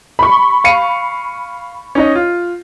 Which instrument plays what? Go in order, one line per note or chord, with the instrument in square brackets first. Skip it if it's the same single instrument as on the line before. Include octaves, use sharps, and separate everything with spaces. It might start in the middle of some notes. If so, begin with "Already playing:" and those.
[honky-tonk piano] B5 C#6
[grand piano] F5 C#7 D#7
C#4 D#4 D#5
F4